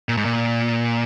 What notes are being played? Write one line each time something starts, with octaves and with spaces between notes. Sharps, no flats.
A#2
G#2
A#2